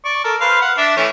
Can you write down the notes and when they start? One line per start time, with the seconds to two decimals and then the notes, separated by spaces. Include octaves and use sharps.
0.05 D5 C#6
0.24 A4 A#4
0.41 B4 C5 F5
0.62 F5 F#5
0.78 D4 E5
0.97 E3 A3 C#4